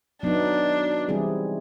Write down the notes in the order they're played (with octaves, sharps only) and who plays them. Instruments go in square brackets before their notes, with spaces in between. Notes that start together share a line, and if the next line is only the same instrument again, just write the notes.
[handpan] F#3 B3 D#4 [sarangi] D4
[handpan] E3 G3 C4 E4 G#4